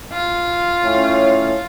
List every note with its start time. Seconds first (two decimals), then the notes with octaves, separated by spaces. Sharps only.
0.13 F4
0.83 A2 C#4